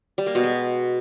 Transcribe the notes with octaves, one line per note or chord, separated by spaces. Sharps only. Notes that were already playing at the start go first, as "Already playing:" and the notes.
G3
A#3
B2
G#3